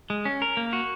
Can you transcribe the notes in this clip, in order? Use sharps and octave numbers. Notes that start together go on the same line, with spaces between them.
G#3
C#4
A#4
A#3
F#4